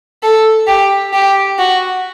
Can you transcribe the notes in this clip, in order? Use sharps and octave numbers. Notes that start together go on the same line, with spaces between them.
A4
G4
G4
F#4